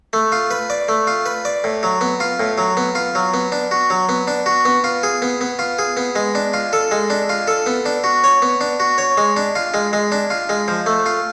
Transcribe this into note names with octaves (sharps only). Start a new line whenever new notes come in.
A3
F4
B4
D5
A3
F4
B4
D5
A2
F#3
B3
F4
A2
F#3
B3
F4
F#3
B3
D4
F#4
F#3
B3
D4
F#4
B3
F4
G#4
B3
B3
F4
G#4
B3
G#3
D4
F4
A4
G#3
D4
F4
A4
B3
D4
F#4
C#5
B3
D4
F#4
C#5
G#3
D4
F4
G#3
G#3
D4
F4
G#3
F3
A3
F4